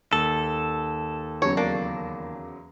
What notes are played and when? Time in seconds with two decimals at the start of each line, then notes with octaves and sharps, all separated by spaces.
0.13 D#2 A4
1.42 E2 C#3 F#3 C#5
1.57 A#3 D4